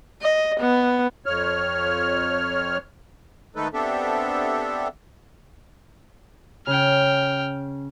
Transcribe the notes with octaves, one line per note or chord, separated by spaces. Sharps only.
D#5
B3
F2 C#5 F6
D#3 G#3 A3 D#4 A4 B4
B3 C4 D4 G4 A4 E5
C#3 G5 F6